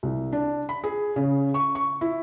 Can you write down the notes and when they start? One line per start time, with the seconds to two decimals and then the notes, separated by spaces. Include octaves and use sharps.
0.03 C2
0.33 D4
0.69 B5
0.84 G#4
1.16 C#3
1.54 C#6
1.75 C#6
2.01 E4